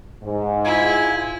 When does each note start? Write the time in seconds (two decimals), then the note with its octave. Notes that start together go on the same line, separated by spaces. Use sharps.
0.23 G#2
0.65 E4 F4 G#5